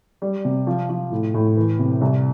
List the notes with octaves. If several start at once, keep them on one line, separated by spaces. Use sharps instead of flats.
G3
C3
F3
F3
A2
A2
E3
C3
C2